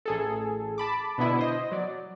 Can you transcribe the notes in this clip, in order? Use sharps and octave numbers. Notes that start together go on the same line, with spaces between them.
A1 G#4 A4
A5 B5 D6
B2 D3 B3 E4
C5 D#5
F#3 D5